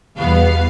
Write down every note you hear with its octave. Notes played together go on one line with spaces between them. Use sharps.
E2 B2 G3 B3 F5